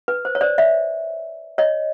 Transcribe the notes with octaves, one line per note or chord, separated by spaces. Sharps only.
B4
C5
C#5
C5 D5
D5 E5
C#5 D#5